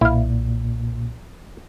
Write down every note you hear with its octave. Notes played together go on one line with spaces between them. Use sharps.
B1 A#2 E4 F5